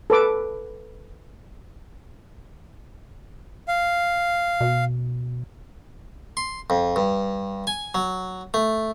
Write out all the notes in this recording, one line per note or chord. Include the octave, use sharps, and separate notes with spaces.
A4 B4 D6
F5
B2
C6
F2
G2
G#5
F#3
A3